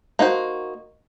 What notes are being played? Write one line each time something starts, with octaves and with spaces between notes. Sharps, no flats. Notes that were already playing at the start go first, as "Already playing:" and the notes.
A#3 D#4 F#4 C5